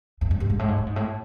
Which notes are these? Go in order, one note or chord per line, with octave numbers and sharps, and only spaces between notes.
F2
F#2
G2
G#2
A2
G#2
A2
G#2
A2